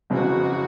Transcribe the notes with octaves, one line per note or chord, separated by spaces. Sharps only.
F#1 F2 C#3 E3 F#4